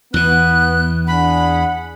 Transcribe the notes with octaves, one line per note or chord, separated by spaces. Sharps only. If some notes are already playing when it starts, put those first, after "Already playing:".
E2 E3 B3 F#6
D4 G#4 F#5 B5